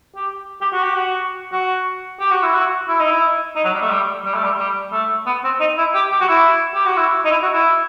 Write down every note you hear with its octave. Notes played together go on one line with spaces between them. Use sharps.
G4
G4
F#4
G4
F#4
F#4
G4
F#4
E4
F#4
E4
D#4
E4
D#4
F#3
G3
A3
G3
G3
A3
G3
G3
A3
B3
C4
D#4
E4
G4
G4
F#4
E4
G4
F#4
E4
D#4
E4
F#4
E4